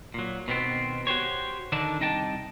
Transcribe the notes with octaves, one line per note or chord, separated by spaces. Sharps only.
A#2 F#3
B2 D#3 B3 C4
F#4 G4 C5 C#5
D3 D#3 D4 D#4 A5
C2 D#4 D#5 G5 A5